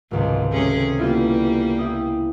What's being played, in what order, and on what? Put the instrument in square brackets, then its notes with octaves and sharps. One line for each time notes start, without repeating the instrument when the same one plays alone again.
[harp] G#1 C#2 C3 [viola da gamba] G#2
[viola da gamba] C3 C#4 G#4 [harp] A3
[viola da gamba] G3 A#3 [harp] B3 E4 F4
[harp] E4 G5 D#6